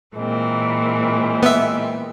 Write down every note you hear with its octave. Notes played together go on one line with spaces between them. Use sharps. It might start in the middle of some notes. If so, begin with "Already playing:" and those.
A#2 E3 G#3 C4
B3 E5